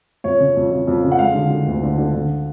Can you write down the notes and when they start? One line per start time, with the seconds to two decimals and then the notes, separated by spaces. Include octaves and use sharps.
0.24 F2 C#5
0.40 C#3
0.57 F2
0.71 F2
0.87 F2
1.04 C#3
1.12 F#5
1.19 G#3 F5
1.34 D3
1.50 D3
1.67 D2
1.83 D3
1.98 D3
2.14 D3